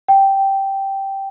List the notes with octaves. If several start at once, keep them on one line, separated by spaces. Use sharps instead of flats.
G5